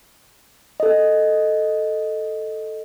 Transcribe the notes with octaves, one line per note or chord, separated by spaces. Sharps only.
A4 D#5